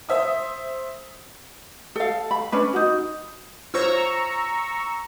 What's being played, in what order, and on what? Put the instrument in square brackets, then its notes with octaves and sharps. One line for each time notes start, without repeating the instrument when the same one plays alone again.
[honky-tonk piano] C5 E5 D#6
[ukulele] A4 F5
B5
C#4 D4 B4
D#4 F#4
[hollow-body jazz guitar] F4 C5 C#5 [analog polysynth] A#5 C#6 E6